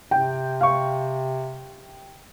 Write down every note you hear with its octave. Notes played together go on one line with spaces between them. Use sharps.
C3 G5
F5 C#6